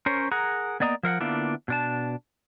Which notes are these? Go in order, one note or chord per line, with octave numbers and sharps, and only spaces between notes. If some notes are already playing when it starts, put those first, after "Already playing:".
C#4 A#4 C5 C#5
G#4 A#4 F#5 A#5
A#3 B3 D5 D#5 A#5
F3 A#4 F5 F#5
D3 A#3 B3 D4 E4 F4
B2 D4 A5